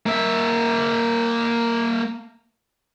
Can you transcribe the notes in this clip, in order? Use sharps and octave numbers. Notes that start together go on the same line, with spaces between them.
A#3 E5